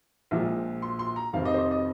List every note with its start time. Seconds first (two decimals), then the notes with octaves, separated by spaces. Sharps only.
0.31 A#1 A#2 F3 G#3
0.82 C6
0.99 C6
1.16 A#5
1.33 F1 F2 C3 D#3 C4 F5
1.45 D#5
1.54 C5
1.59 D#5
1.71 D#5